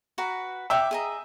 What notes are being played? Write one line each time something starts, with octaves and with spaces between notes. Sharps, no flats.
F#4 B4 A#5
B4 E5 G5 D6
G#4 D#5 A#5